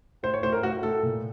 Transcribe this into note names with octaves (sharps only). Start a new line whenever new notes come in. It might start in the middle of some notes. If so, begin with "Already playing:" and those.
A2 C5
C#5
A2 C5
A#4
A2 F#4
A2 A4
A#2